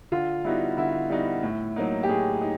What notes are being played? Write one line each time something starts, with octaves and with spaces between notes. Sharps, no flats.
D3 F4
G3 B3 D#4 E4 F#4
D3 E4
G3 B3 D#4 F#4
A2
F#3 A#3 D#4
G4
A2 G#4
D#4